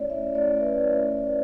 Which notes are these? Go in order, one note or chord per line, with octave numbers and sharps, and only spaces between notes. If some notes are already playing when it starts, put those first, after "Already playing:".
Already playing: A3 C#4 E4 C#5 D5
E5
A3 C#4 E4 D5
B4